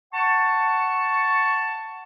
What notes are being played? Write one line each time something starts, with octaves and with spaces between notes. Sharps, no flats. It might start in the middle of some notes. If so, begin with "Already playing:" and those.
F#5 A5 C#6